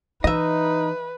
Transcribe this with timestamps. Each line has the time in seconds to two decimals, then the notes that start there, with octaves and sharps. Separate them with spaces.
0.24 E3 D#4 B4 D#5 E5